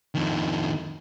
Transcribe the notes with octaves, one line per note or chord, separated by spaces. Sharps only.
F2 D#3